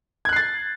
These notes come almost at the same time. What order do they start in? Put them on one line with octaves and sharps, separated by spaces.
G#6 F#6 C7 A6